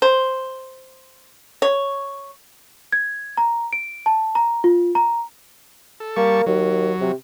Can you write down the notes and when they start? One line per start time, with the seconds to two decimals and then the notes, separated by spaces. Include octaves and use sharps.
0.02 C5
1.62 C#5
2.93 G#6
3.37 A#5
3.73 D7
4.06 A5
4.35 A#5
4.64 F4
4.95 A#5
6.00 A4
6.16 G3 A#3 A5 C#6
6.46 D#2 F#3
7.01 C3